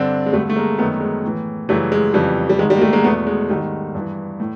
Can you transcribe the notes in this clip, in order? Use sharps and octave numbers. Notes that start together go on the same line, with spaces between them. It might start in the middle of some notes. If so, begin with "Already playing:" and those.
Already playing: G2 D3 C4 D4
G#3
G2 D3 G3 A3
A3
G#3 A#3
F#2 D#3 A3 B3
G#3
A2 E3
F#2 C#3 E3 G3 A3
G#3
F2 C#3 E3 G3
G3
G#2 D#3 G#3
G3
A#3
G3 A3
G#3 A#3
E2 B2 A3 B3
G#3
G#2 D#3 G3 A3
G2 E3
A2